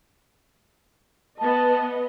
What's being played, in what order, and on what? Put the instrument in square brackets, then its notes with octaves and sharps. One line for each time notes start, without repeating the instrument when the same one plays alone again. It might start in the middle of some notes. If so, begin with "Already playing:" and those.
[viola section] B3 D#5 [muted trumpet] A5